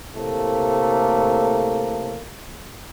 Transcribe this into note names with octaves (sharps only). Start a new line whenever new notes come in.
A2 C3 A3 A#3